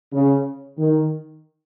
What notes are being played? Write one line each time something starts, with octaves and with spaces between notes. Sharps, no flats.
C#3
D#3